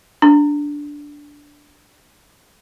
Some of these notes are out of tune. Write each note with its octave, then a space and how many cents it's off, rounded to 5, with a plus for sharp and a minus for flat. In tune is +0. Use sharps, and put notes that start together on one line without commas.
D4 -5